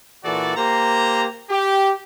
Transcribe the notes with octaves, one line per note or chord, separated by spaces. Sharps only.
A#2 E3 F#4 A4 D5
A#3 G4 C5 A#5
G4